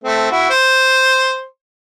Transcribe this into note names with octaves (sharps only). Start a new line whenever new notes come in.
A3 C4
E4 F#4
C5